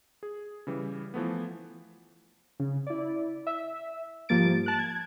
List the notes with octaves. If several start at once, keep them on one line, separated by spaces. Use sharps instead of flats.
G#4
C#3 E3 G3
E3 F3 A3 B3
C#3
E4 D5
E5
G#2 F3 G3 A#3 A6 D7
A5 F#6
G#6